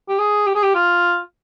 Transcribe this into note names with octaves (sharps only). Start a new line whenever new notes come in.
G4
G#4
G4
G#4
G4
F4